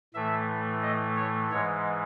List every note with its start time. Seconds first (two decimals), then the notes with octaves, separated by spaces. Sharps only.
0.14 A2 E3 A3 E5
0.82 D#5
1.16 C#5
1.51 G#2 E3 G#3 C#5